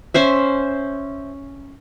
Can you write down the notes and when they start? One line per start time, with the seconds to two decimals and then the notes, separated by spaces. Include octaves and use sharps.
0.14 C#4 C5 E5